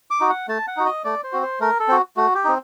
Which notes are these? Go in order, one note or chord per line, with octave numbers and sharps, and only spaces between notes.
D6
D#4 F#4
F#5
A3 A5
F#5
D#4 F#4
D#5
A3 D5
C5
C4 F#4
C5
A3 A#4
A4
C4 F#4
A3 F#4
G4
C4 D#4